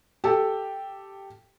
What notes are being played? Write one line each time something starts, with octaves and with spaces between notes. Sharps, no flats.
G4 A4 G5